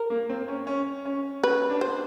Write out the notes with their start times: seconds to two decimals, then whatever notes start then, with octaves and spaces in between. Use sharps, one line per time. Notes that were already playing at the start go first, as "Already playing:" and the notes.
Already playing: A#4
0.10 A#3
0.29 C4
0.48 C#4
0.67 C#4
1.05 C#4
1.43 C#4 B4
1.70 D4
1.81 C5